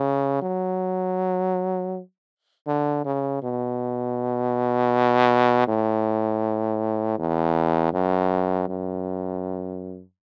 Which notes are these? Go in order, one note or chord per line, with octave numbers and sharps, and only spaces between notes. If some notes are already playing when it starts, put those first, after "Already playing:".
Already playing: C#3
F#3
D3
C#3
B2
A2
E2
F#2
F#2